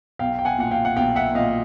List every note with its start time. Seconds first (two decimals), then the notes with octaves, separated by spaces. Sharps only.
0.19 B1 F5 G5
0.39 G5
0.45 F#5 G#5
0.58 A#2 F#5
0.71 F5 G5
0.85 F#5
0.96 B1 F5 G5
1.16 E5 F#5
1.35 A#2 D#5 F5